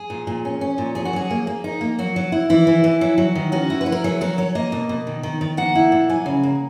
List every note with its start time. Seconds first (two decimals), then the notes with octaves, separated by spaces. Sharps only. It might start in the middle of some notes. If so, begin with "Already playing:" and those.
Already playing: G#4
0.10 A#2
0.27 A#2
0.45 C#4
0.61 C#4
0.78 A#2
0.95 C#4 G#4
1.05 F#4
1.13 F#3 G#4
1.30 A#3
1.47 A#3
1.64 D#4
1.81 A#3
1.99 F#3 F#4
2.16 F#3
2.32 E4
2.50 E3 E4
2.67 E3
2.84 E3
3.01 F#3
3.18 F#3
3.35 D#3
3.52 C#4 F#4
3.70 E4
3.81 B4
3.86 E4
3.92 A#4
4.04 F#3 G#4
4.21 F#3 A#4
4.38 F#3 C#5
4.55 A#3 D#5
4.72 B2
4.89 B2
5.07 D#3
5.23 D#3
5.41 D#3
5.57 A#3 F#5
5.75 E4
5.92 A#2
6.09 F#3 G#5
6.26 C#3
6.43 A#3